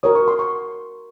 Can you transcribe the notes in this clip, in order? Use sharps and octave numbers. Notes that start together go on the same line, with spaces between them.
F#4 A#4 C#5 D#6
C#6
C6
C#6